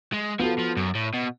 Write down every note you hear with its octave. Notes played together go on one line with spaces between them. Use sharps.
G#3
F3 B3 F#4 A4
F3
F#2
A2
B2